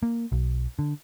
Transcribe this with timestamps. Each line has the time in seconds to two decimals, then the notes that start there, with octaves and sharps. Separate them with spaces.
0.03 A#3
0.32 B1
0.79 D3